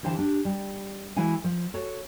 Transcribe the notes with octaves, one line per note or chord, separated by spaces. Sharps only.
D3 E3 G4 C5 F5 A5
D4 G4
G3
E3 G#3 E4 F#4 F5 G#5
F3
F#4 A4 C#5